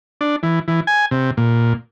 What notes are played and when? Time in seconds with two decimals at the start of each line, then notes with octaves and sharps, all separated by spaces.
0.21 D4
0.43 E3
0.68 E3
0.87 G#5
1.11 C3
1.37 A#2